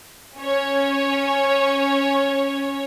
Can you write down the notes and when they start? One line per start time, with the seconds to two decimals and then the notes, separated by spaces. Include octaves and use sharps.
0.37 C#4 C#5